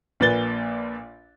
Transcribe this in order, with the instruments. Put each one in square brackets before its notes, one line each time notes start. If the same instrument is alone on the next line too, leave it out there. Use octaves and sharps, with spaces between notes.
[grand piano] A#1 A#2 B4 A6 G7